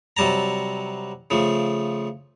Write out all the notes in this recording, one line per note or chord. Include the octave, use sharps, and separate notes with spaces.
C3 F#3 G3 A5 A#5
C#3 F3 A3